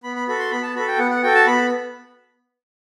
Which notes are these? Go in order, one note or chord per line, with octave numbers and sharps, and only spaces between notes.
B3 B5
B5
F#4 A4 B5
C6
B3 B5
A5
F#4 A4 B5
G5
B3 F#5
F#5
F#4 A4 G5
A5
B3 B5